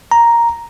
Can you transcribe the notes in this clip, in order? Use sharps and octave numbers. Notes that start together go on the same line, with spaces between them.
A#5